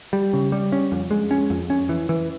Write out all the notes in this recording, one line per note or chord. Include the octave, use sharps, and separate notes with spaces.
G3
C#3
G3
C#4
F2
G#3
C#4
F2
C#4
E3
E3